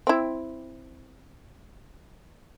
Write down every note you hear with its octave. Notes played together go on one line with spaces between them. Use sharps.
C4 E4